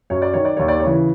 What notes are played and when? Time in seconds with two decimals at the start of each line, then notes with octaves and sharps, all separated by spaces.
0.10 F#2 C#5
0.22 D5
0.34 D#3 C#5
0.45 D5
0.57 D#2 C#5
0.68 D5
0.80 C#5
0.83 C#3 E3